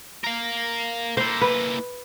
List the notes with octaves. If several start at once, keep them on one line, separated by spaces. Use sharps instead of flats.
A#4 F5
A#3 E4 C5
B4